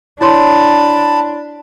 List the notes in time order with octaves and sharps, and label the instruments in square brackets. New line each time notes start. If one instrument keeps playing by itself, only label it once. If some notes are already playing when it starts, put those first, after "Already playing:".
[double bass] D4 [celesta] E4 C#5 C6 [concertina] A5 B5